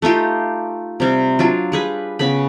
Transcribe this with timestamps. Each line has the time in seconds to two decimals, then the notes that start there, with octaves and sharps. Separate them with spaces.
0.02 A3 D#4 F4 G4
1.00 C3 G3
1.39 F#3 D4 F4
1.72 G3 G#4 B4
2.19 C#3 B3 B5